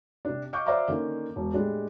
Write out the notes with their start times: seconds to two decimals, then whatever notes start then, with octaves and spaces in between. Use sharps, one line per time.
0.25 C3 D4
0.53 D#5 F5 C#6 D6 G6
0.66 C5 D5 E5 F5 A#5 D6
0.88 D3 D#3 A#3 C#4
1.36 E1
1.53 A2 G3 G#3 D4